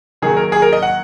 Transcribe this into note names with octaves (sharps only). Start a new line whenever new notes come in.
D#3 F#3 A#3 G#4
A#4
G#4
A#4
D#5
F#5